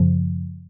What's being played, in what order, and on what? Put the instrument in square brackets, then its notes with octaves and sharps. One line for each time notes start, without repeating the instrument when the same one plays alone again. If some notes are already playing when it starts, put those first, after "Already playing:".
Already playing: [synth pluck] F#2 C#3 F3